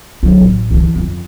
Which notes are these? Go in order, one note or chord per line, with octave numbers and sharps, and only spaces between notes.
D3 F#3
A1
D3 E3
F2